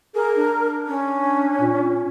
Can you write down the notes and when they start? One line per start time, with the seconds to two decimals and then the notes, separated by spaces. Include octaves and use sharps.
0.15 G#4 A#4
0.36 D4
0.87 C#4
1.61 A#2